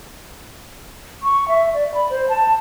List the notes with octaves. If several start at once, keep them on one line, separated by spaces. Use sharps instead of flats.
C#6
E5
D5
B5
C5
A5